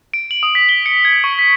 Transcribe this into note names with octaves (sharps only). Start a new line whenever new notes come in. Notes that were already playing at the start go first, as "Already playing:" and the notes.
D7
F#7
D#6
B6
G7
C#7
G#6
C#6
B6